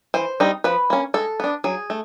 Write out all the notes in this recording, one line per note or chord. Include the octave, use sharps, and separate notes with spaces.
E3 C5
G3 C4 D#4
F3 B4
A#3 C#4
G#3 A4
B3 D4
F#3 G#4
A3